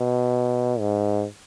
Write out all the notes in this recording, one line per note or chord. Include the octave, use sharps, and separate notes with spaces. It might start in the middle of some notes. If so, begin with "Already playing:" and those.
Already playing: B2
G#2